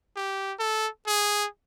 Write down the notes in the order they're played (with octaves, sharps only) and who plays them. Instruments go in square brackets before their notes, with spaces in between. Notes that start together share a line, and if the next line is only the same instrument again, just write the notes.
[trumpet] G4
A4
G#4